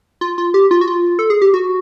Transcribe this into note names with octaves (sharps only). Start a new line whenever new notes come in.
F4
F4
G4
F4
F#4
F4
A4
G#4
G4
F#4